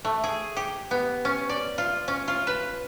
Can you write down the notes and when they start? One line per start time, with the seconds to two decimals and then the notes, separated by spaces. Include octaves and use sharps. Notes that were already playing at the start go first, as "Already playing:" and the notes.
0.05 A3
0.24 G#4
0.56 G4
0.91 B3
1.25 C#4
1.49 D5
1.78 F4
2.08 C#4
2.28 F4
2.47 B4